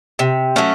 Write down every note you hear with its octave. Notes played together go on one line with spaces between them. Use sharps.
C3
F#3 A3 C#4